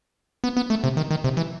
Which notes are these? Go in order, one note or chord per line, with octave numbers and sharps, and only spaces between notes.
B3
B3
A3
C3
D#3
D#3
C3
E3